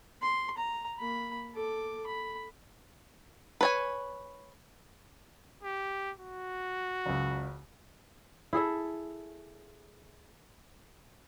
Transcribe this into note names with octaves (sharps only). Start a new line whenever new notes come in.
C6
A#5
A#3 B5
A4 D6
B5
B4 C#5 G#5
G4
F#4
F#1 C#2
E4 G#4 A4 E5